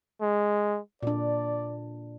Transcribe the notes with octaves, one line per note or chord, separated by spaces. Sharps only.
G#3
A#2 D4 D5